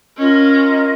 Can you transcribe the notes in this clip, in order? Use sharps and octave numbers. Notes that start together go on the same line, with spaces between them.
C#4 F4 A#4 D#5